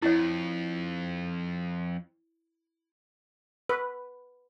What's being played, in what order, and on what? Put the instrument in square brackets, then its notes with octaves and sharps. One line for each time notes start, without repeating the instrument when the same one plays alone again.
[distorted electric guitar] F2 [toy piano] E4 C#5
[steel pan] B4